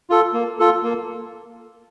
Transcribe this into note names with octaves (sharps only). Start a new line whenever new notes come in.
F4 A4
A#3
F4 A4
A#3